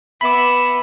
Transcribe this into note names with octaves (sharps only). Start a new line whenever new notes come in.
B3 E5 B5 D6